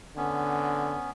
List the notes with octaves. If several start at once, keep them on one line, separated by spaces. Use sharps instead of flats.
D3 B3 C#4